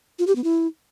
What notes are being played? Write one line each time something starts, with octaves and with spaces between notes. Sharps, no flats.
F4
G4
B3
E4